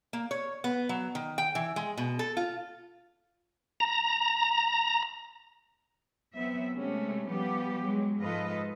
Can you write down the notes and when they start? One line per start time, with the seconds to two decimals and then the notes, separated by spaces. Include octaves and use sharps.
0.13 A#3
0.31 C#5
0.64 B3
0.89 F#3
1.15 D#3
1.38 G5
1.55 E3
1.76 G#3
1.97 B2
2.19 A4
2.37 F4
3.80 A#5
6.36 F#3 B3 C4 E5
6.75 C3 G#3 A3 C#4
7.29 F3 G3 B3 G4
7.85 F#3 G#3
8.22 G#2 F3 F4 A4 B4 D#5